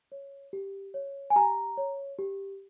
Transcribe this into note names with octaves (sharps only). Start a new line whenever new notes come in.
C#5
G4
C#5
G#5
G4 A#5
C#5
G4